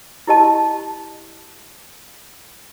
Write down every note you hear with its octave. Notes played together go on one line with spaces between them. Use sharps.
E4 G4 D#5 A5